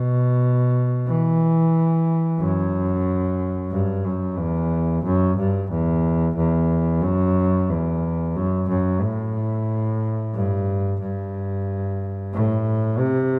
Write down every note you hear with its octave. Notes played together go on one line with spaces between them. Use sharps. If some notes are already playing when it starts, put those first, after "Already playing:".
Already playing: B2
E3
F#2
G2
F#2
E2
F#2
G2
E2
E2
F#2
E2
F#2
F#2
A2
G2
G2
A2
C3